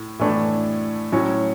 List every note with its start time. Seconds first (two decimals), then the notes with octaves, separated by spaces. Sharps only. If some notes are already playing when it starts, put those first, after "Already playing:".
Already playing: A2
0.19 A2 E3 A3 D4
1.12 A2 F#3 C#4